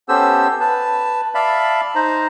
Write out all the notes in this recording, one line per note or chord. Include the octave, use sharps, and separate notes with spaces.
B3 C#4 G4 A4 C5 E6
B4 A5
D5 E5 F5 A5 B5
D#4 C5 A#5